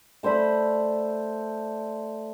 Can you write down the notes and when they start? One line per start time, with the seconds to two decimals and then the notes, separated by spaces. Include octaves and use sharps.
0.23 A3 C5 D5 B5